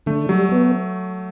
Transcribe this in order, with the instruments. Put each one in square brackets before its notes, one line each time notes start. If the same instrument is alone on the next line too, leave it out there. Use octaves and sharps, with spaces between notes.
[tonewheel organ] D3 [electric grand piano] A3
[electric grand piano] F#3 [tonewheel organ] G3
[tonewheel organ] B3